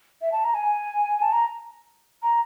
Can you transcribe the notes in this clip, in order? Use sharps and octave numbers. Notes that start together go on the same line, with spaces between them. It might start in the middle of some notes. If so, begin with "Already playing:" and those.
E5
A5
A#5
G#5
A5
A#5
A#5